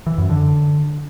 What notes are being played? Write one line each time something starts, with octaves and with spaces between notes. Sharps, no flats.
E3
F#2
D3